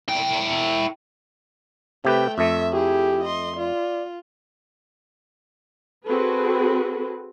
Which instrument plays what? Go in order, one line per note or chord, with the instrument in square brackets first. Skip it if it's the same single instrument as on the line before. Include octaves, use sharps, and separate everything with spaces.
[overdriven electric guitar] E4 G5
[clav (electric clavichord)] C3 G4 B4 [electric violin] A3 G5
[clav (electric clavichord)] F2 A3 [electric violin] E5
[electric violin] E4 G#4 [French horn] G4
[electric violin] D#5 C6
[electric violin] F4 [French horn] D5
[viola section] C4 F#4 G#4 A4 B4